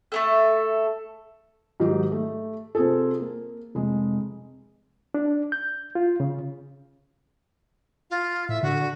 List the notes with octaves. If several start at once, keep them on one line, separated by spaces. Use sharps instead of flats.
A3 B3 A4
G#2 D#3 F#3 D#4 G4
A3
C3 C4 F4 G#4 A4
A#3
F1 G#3
D4
G6
F4
C#3
F4
A2 E5
D3 F#4